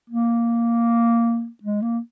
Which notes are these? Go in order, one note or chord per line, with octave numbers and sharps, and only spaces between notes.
A#3
G#3
A#3